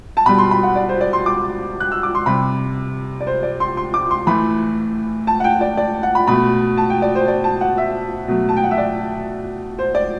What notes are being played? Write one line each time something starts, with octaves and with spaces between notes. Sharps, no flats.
A5
B2 G3 B5
C6
B5
F#5
D5
C5
D5
C6
D6
F#6
E6
D6
C6
C3 G3 B5
D5
C5
D5
C6
C6
D6
C6
A2 E3 A3 B5
A5
F#5
G5
D5
D5
F#5
B5
B2 A3 B5
A5
G5
D5
C5
D5
A5
F#5
E5
B2 F#3 A3
A5
G5
F#5
E5
D5
C5
D5